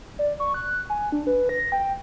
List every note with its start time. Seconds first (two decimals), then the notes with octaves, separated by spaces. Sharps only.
0.19 D5
0.40 C#6
0.54 F#6
0.90 G#5
1.12 D4
1.27 B4
1.49 A#6
1.72 G5